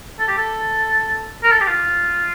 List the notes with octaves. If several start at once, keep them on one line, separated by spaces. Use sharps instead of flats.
A4
G4
A4
A#4
A4
G4
F4